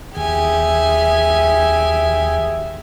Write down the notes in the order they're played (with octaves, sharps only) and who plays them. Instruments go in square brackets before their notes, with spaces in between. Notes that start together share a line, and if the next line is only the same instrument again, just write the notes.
[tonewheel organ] D#2 [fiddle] G4 G#5 [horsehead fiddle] G#4 E5